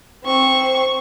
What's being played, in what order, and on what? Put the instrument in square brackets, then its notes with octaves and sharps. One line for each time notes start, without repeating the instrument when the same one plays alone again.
[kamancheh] C4 C#6